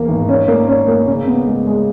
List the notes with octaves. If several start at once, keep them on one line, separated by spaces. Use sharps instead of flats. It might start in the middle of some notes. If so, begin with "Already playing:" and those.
Already playing: E2 E3 A#3
G#1
C#4
A#3
C#4
A#3
C#3
B3
G#3
G#3